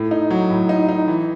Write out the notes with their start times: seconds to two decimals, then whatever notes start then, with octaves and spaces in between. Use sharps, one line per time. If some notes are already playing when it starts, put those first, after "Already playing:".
Already playing: A2
0.11 D#4
0.30 F#3
0.50 A2
0.69 D#4
0.89 D#4
1.08 E3